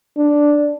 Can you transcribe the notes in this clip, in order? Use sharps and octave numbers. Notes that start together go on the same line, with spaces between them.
D4